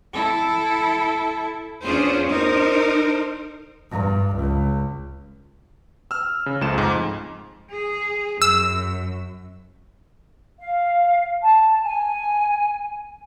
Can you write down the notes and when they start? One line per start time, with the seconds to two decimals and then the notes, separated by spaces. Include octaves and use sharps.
0.13 E4 A4
1.82 E2 C#4 D4 F4 G#4 C5
2.28 D#4 A#4 C5
3.91 G2
4.36 C#2
6.11 E6 F6
6.46 C#3
6.61 C#2 F3 A3 E7
6.74 F2 G#2
7.71 G#4
8.42 F#2 E6
10.59 F5
11.42 A5
11.83 G#5